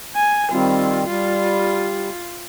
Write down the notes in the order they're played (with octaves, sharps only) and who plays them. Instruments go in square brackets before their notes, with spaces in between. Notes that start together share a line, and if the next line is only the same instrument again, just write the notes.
[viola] G#5
[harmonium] D#3 G3 C4 [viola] F4
[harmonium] G3 [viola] F4